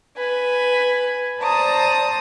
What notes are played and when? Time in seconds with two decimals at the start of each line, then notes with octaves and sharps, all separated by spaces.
0.17 B4 G#5
1.41 C5 D5 A5 A#5 D#6